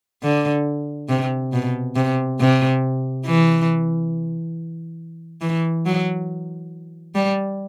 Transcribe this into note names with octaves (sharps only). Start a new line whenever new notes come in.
D3
C3
B2
C3
C3
E3
E3
F#3
G3